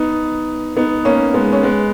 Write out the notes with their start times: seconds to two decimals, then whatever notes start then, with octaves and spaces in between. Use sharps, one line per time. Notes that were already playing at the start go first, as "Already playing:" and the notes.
Already playing: B3 D#4
0.77 B3 D#4
1.05 A#3 C#4
1.34 G#3 B3
1.53 C#4
1.63 G#3 B3